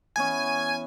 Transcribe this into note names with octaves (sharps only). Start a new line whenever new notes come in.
E3 B3 C#4 G#5